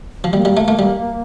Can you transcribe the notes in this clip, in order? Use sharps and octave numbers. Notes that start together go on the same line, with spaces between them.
F3
G3 A#3
G3
A3
A3
G3